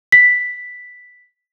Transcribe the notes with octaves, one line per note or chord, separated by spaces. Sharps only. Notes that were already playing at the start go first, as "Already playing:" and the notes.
B6